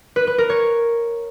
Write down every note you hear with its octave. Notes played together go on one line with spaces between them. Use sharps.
B4
B4
A#4
C#5